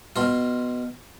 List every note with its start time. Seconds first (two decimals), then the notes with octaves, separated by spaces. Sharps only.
0.16 B2 F4